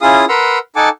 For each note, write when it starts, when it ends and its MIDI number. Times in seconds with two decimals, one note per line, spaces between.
0.01 0.25 61
0.01 0.25 64
0.01 0.25 65
0.01 0.25 68
0.01 0.25 77
0.01 0.25 87
0.29 0.58 70
0.29 0.58 71
0.29 0.58 78
0.29 0.58 82
0.29 0.58 84
0.29 0.58 88
0.76 0.89 63
0.76 0.89 69
0.76 0.89 78
0.76 0.89 80
0.76 0.89 81
0.76 0.89 86